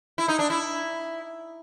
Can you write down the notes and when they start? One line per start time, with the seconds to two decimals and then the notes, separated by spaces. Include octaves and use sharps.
0.18 E4
0.28 D#4
0.39 D4
0.50 E4